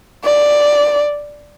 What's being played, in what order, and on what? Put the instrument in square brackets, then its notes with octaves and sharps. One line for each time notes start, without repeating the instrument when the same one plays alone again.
[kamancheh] D5